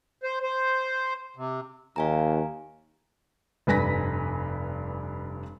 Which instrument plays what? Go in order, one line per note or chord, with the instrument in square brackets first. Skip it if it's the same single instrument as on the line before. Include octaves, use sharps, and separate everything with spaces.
[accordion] C5
C5
C3
[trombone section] D#2 [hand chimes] F5 G#5 A#5
[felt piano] F1 G2 B4 G#5 A#6 B6